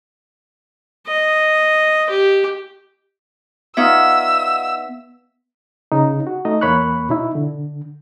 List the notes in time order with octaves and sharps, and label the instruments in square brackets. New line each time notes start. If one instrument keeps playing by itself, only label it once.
[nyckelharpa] D#5
G4
[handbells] B3 E5 [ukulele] D#4 F4 D5 [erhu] E6
[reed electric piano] C#3 D#4
F#4
A3 D#4 D#5
E2 A#3 C#5 B5 C#6 F#6
B2 D#4 E4
D3